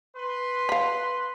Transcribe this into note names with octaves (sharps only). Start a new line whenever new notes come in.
B4 C6
F5 B5